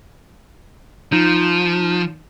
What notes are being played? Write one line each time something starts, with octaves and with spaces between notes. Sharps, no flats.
F3 D#4